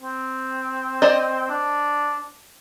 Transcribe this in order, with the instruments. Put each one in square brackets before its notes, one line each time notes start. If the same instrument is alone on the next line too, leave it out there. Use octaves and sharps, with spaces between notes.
[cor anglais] C4
[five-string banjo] C5 D5 D#5
[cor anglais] D4